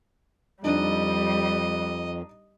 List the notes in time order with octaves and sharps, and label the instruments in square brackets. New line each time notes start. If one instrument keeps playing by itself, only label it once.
[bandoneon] F2 [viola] G3 [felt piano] D4 D#4 [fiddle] D#5